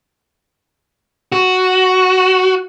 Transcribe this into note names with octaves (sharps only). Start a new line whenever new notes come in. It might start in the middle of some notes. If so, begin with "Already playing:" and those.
F#4